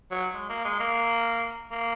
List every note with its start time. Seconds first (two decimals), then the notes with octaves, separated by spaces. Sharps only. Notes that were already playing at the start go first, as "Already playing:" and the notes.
0.11 F#3
0.34 G#3
0.49 A#3
0.64 G#3
0.80 A#3
1.71 A#3